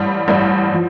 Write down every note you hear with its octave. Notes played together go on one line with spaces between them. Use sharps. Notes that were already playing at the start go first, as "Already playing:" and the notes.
Already playing: A1 G2 G3
A1 G2 G3
F3